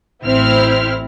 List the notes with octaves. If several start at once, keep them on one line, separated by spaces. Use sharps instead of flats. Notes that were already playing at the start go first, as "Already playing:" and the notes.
A1 C4 E4 F6